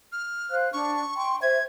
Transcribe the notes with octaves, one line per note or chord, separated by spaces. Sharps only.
F6
C5 F5 F#6
D4 C#6
G5 C6
C5 E5 G#6